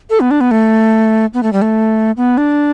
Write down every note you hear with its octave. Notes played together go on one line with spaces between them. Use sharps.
A4
B3
D4
B3
A3
B3
A3
G3
A3
B3
D4